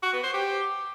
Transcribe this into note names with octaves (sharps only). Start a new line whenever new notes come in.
F#4
B3
C5
G4